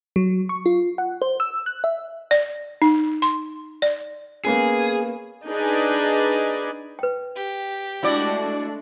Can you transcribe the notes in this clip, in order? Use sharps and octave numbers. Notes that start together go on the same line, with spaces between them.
F#3
C#6
F4
F#5
C5
E6
F#6
E5
D5
D#4
C6
D5
A#3 B3 C#4 G#4
D4 D#4 G#4 B4 D5 G#5
B4 G5
G4
G#3 A3 D4 E4 F#4 D5